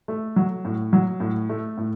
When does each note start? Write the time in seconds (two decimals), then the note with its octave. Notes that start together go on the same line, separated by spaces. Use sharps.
0.08 A3
0.36 F#3
0.65 A2
0.93 F#3
1.20 A2
1.49 A3
1.78 A2